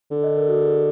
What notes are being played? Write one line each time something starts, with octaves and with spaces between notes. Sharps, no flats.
D3
D#5
A#4
F#4
G#4